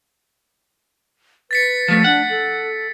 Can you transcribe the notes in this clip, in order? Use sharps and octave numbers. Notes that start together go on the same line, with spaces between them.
B4 A6 B6 C#7
F3 A3
D4 F#5
A4